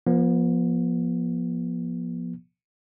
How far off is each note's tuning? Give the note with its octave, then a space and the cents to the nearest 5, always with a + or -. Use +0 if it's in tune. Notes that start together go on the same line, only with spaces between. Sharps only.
F3 +0 B3 -45